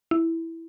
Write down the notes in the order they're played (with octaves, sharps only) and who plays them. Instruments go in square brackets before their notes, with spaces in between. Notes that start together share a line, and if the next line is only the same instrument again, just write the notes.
[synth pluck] E4